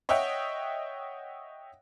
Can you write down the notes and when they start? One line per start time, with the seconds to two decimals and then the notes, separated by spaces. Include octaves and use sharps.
0.09 C#5 D#5 E5 F#5 G5